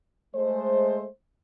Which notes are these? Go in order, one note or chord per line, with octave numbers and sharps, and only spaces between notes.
G#3 A3 C5